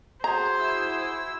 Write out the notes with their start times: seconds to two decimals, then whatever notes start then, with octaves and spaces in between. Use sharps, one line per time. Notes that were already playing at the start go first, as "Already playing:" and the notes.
0.24 F#4 G#4 C5 A#5
0.59 E4 E6